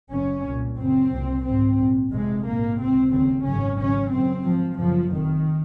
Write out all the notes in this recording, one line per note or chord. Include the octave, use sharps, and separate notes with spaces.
F#1 F#2 C#3 C#4
C2 A#2
F#1 F#2 C#3 C4
C2 A#2
G#1 G#2 C4
A#1 A#2
F1 F2 C3 G#3
A#1 G#2 A#3
C#2 C3 C4
F1 D#2 C#3 C4
G#1 F#2 C#3 C#4
G#1 F#2 C#3 C#4
G#1 F#2 C#3 C4
G#1 G#2 F3
F#1 F#2 C#3 F3
F1 F2 C3 D#3